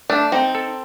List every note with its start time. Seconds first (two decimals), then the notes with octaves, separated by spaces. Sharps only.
0.10 A3 D4
0.32 C4 D#4
0.55 A4